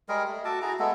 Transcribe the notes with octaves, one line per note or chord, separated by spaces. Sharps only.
G3 G#3 G#4 A#4
A3
F#4 A4 A5 D6
E4 F#4 G#4 A#5
G#3 A3 B3 A4